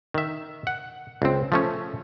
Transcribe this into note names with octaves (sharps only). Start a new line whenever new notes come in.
D#3 E5
F#5
C#2 C4
F3 A3 C#4